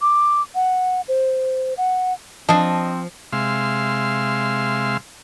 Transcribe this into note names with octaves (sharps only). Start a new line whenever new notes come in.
D6
F#5
C5
F#5
F3 C4 D4 D#5 A5
C3 G#3 E5 F5 C6